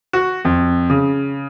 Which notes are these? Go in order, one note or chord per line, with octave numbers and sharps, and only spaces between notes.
F#4
F2
C#3